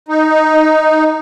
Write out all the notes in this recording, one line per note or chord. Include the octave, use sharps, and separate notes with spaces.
D#4